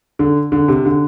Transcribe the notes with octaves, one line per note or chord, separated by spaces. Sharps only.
D3
D3
C3
D3